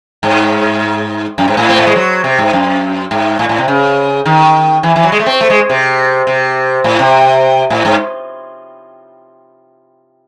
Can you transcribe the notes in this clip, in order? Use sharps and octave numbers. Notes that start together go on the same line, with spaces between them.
G#2
F#2
G#2
A2
C4
A3
G#3
F#3
C3
G#2
F#2
G#2
A2
A2
C3
C#3
D#3
E3
E3
F#3
G#3
A3
C4
A3
G#3
C3
C3
A2
C3
A2
G#2